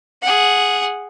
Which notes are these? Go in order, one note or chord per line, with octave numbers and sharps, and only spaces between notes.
G#4 F#5